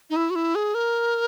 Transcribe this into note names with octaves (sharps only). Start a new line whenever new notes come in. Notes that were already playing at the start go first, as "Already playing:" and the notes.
D#4
E4
F#4
E4
G#4
A#4